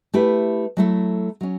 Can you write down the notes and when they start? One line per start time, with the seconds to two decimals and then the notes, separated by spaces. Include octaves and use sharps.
0.14 A3 E4 G4 B4
0.77 F#3 A3 E4 A4
1.41 F#3 C#4